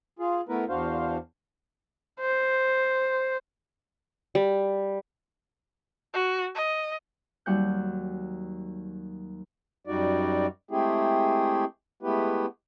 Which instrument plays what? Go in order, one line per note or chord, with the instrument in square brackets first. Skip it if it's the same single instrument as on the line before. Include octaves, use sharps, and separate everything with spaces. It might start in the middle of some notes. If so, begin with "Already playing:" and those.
[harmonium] F4 G#4
A3 B3 E4 A#4 B4
E2 D4 F#4 C5 F5
[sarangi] C5
[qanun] G3
[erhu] F#4
D#5
[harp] D#2 F#3 G3 F#5 F#6 G6
[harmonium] F#2 G3 D#4 F#4 D5
G#3 A3 C4 E4 G4 G#4
G#3 A3 B3 E4 G4 B4